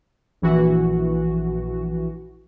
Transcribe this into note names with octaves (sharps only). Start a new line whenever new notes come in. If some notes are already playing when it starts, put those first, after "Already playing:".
A#1 E3 F#4